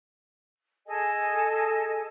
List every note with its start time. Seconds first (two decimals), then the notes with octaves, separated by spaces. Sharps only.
0.86 G#4 A4 D#5 G#5